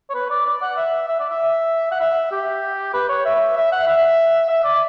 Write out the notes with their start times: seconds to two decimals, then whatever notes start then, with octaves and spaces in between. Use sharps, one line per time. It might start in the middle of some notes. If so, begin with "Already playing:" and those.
0.10 C#5
0.15 B4
0.30 D5
0.46 D5
0.62 F#5
0.77 E5
1.08 E5
1.20 D5
1.30 E5
1.92 F#5
2.00 E5
2.32 G4
2.94 B4
3.09 C#5
3.25 E5
3.56 E5
3.72 F#5
3.87 E5
4.49 E5
4.64 D5